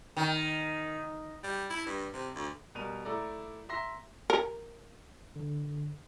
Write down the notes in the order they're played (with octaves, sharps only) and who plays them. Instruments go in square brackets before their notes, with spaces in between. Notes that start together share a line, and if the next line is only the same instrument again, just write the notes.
[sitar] D#3
[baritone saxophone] G3
E4
G2
C3
D2
[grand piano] B2 G3 A#4 D#7 F7
A3 E4 A4 D5 A#5
E5 A#5 C6 A#6
[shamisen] A#4
[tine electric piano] D3